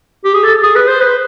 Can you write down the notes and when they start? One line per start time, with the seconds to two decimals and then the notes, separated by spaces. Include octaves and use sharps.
0.24 G4
0.34 G#4
0.43 A4
0.63 G#4
0.75 B4
0.88 C5
1.01 B4